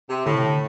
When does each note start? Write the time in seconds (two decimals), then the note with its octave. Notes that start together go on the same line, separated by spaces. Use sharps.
0.10 C3
0.26 A2 D3
0.35 C3
0.45 D3